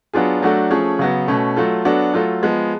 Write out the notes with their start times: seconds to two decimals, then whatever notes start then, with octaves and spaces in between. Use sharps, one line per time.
0.13 F#3 B3 D4 F4 G#4
0.42 F#3 A3 D4 F#4 A4
0.71 F3 A3 C#4 G#4
0.99 C#3 F#3 B3
1.28 B2 A3 C#4
1.56 F#3 A3 F4 A4
1.85 F#3 B3 D4 F#4 A4
2.14 F#3 A3 F4 A4
2.43 F3 G#3 B3